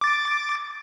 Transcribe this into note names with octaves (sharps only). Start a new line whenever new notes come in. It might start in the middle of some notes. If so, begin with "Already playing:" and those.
D6 A6